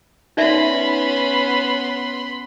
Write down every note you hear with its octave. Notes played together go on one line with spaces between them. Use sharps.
B3 C#4 D#4 D5 E5 B5 C6